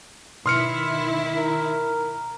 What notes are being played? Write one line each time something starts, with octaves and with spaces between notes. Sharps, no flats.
B2 D#3 E4 C6 F6 C#7
A#4